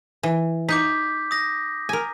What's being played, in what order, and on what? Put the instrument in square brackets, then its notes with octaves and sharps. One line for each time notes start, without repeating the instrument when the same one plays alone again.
[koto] E3
[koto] D#4 [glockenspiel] D6 G6 B6
[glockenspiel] D#6 A#6
[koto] A#4 G#5